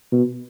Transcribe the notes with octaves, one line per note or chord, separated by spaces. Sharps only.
B2